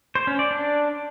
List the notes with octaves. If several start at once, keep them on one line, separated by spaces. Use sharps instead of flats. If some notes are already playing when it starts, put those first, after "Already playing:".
C5
C#4
D5
D4